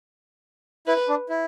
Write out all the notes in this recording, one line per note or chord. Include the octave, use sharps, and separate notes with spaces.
E4 B4
D4
E4